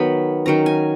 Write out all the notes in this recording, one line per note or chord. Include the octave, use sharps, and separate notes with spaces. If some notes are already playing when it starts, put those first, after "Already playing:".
Already playing: D#3 F#3 B3 B5
D#3 F#3 C#4 A#5
G#5